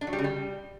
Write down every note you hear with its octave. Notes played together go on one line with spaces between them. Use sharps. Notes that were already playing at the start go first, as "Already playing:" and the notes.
D4
F#3
G3
C#3
G3